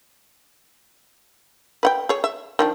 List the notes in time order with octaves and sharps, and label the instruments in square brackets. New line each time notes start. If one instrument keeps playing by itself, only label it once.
[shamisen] B4 F#5 G5
G#4 C#5
E5
D#3 F3 D4